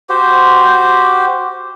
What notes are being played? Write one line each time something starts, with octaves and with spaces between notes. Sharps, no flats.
F#4 G4 C5